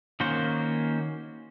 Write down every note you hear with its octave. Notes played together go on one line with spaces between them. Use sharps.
D#3 A#3 C#4 F#4 C5